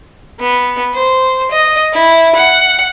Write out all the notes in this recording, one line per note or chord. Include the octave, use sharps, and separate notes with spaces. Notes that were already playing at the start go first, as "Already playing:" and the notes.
B3
C5
D#5
E4
F#5